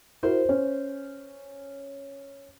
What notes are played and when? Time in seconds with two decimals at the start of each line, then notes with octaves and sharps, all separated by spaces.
0.23 E4 F#4 A#4 C5
0.49 C#4